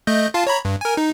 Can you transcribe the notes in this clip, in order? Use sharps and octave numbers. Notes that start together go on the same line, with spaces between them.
A3 D#5 G6
F4 F5 A5
C#5 A#5 B5
G2
A#4 G#5
D#4